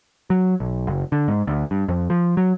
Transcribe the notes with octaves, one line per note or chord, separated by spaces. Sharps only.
F#3
B1
F#1
D3
G#2
D2
G2
F2
F3
F#3